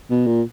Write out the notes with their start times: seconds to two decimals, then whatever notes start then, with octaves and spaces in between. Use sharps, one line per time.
0.10 B2
0.27 A#2